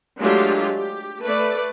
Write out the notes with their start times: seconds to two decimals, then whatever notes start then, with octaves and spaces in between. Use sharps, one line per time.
0.20 F#3 G#3 A3 D4 F4 G4
0.79 G4
1.22 A3 B4 D5